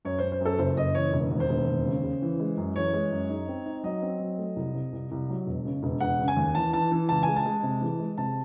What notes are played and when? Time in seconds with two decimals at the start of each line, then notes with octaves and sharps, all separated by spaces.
0.05 F#2 C#5
0.19 F#2 C5
0.32 C5
0.40 F#2
0.45 A4
0.59 F#1 C5
0.77 F#1 D#5
0.95 E3 C#5
1.13 E1
1.31 D#2
1.40 C5
1.49 E1
1.67 D#2
1.85 C#3
2.04 C#3
2.22 E3
2.40 G#3
2.57 F#2
2.76 E3 C#5
2.94 G#3
3.11 F#2
3.30 D#4
3.48 C4
3.66 D#4
3.84 F#3 D#5
4.02 C4
4.20 F#3
4.38 A3
4.56 C2
4.74 C3
4.92 C2
5.11 C2
5.29 F#3
5.46 E1
5.65 C#3
5.83 E1
6.00 E1 F#5
6.19 C#3
6.28 G#5
6.37 D#2
6.55 E3 A5
6.73 E3 A5
6.92 E3
7.09 C#2 A5
7.23 G#3 G#5
7.36 A5
7.45 G#3
7.63 C3
7.81 E3
8.00 G#3
8.18 C3 A5